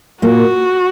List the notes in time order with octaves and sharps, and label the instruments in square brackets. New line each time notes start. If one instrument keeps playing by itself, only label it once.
[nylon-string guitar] A#2 A#3 [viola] F#4